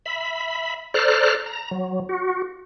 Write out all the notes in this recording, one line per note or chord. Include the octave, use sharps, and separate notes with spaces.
E5 B5
A4 C5 D5 A#5 F6 F#6
A#5
F#3
F#4